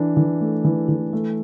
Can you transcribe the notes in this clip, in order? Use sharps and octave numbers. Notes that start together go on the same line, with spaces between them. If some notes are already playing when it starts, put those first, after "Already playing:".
Already playing: E3 D4
E3
A3
E3
E3
A3